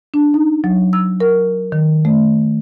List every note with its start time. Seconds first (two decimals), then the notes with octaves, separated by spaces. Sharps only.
0.14 D4
0.34 D#4
0.64 F#3
0.93 E6
1.20 A#4
1.72 D#3
2.05 A3